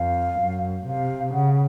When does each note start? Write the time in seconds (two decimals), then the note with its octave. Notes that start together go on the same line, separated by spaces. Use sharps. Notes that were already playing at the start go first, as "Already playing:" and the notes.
Already playing: F2 F5
0.40 F#2
0.87 C3 F5
1.34 C#3 F#5